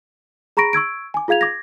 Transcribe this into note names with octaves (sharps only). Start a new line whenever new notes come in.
G#4 A#5 B5 C#6 A#6 D7
C#6 E6 G#6 D7
G#5 D6
F4 G#4 F5 G#6 F7
D6 G#6 A#6